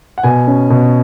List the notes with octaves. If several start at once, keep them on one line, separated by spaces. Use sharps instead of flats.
F#5
B2 G#5
C#4
B2